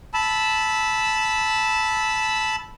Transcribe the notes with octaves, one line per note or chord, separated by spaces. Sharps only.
A5 B5 E6